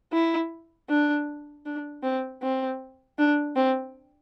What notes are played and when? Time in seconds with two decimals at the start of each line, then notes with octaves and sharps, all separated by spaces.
0.13 E4
0.89 D4
1.65 D4
2.03 C4
2.42 C4
3.18 D4
3.56 C4